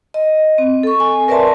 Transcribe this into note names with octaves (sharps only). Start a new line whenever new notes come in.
D#5
C4
A4 C#6
G#5
A#4 B4 D5 E5 A5 C6